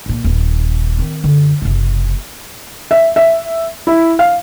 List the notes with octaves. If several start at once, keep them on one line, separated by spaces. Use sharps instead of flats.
B1 A#2
D#1
D#3 C4
F#2 D3
F#1 C3
E5
E5
E4
F5